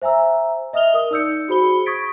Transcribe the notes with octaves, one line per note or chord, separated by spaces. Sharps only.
C5 E5 G#5 A#5 E6
D#5 E5 D#6 F6 F7 G7
A#4 D#6
D#4 D5 E6 G6 C#7
F#4 G#4 C5 B5 C#7 G7
C#6 D#6 G#6 A6 B6 D7